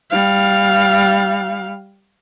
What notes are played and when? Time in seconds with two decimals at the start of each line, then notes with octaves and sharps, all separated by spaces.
0.10 G3 F5